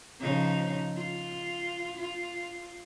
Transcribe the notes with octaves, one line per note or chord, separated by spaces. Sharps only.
C#3 F3 D#4
F4
F4